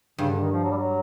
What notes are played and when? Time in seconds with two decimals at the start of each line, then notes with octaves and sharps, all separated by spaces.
0.18 G2 C#3
0.30 D3
0.41 D#3
0.52 F3
0.63 F#3
0.71 G3
0.77 F#3